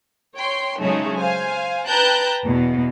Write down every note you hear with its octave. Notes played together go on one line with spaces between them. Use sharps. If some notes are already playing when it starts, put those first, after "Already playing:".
C#5 G5 C6
C#3 F#3 G#3 A3 C#4 D#4
C5 F5 G#5
B4 G5 A5 A#5 F#6 G6
E2 B2